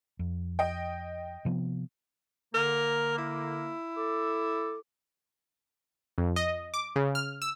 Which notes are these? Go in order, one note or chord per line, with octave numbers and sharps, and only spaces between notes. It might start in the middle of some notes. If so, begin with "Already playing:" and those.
F2
D#5 G5
C3 F3 B3
D3 A#3 A#4
E4
A4 D6
F2
D#5
D6
C#3
F6
E6